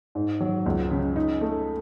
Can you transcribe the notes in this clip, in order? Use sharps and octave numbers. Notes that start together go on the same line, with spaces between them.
G#2
F#3
C#2
C#3
D#4
A3